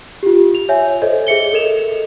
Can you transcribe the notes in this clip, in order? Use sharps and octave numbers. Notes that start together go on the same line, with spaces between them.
F4 G4
F7
C#5 E5 G#5
A4 C5 C#5 D#5
G#4 E5 C#7 G7
A4 A#4 D#5 E7 F7